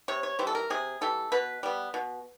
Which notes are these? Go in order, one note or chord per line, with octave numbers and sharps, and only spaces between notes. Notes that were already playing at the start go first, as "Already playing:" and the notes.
C3 C#5
C#5
E3 G3 C5
A4
A#4
C3 G#4
E3 G3 A4
B2 B4
G3 B3
B2